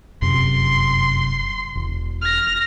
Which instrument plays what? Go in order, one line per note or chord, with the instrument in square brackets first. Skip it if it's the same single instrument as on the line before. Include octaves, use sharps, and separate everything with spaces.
[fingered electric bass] F1 F#2 C3 [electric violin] C6
[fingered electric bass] E1
[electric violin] F6 A#6